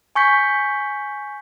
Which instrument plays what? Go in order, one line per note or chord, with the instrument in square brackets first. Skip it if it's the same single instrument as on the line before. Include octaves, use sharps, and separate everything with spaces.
[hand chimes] G#5 C#6 G6 B6